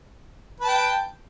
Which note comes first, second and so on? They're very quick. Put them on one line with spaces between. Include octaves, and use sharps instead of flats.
B4 A5 G5